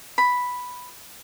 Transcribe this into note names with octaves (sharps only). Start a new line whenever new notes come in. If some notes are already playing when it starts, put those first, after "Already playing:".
B5